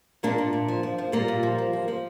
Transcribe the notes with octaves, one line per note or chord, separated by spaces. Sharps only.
A#2 A#3 D4
A#2
A#2
F3
F3
F3
A#2 G3 A#3
A#2
F3
F3
F3
F3